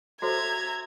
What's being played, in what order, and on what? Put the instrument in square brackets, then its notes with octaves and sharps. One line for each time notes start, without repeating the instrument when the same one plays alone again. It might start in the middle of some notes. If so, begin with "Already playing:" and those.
[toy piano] F#4 A4 C5 [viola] E5 A#5 [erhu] G#6